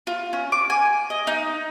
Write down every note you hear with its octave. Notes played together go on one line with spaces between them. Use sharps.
F4
C#4
D6
G#5
D#5
D#4